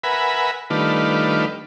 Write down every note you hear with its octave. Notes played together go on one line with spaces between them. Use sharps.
A#4 B4 E5 F#5 G#5 B5
D#3 G3 A3 D4 F4 B4